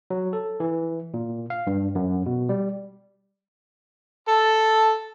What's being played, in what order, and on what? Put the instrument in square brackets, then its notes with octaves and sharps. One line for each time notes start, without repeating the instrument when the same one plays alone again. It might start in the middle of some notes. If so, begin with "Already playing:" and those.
[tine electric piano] F#3
A4
E3
A#2
F5
G2
F#2
B2
G3
[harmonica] A4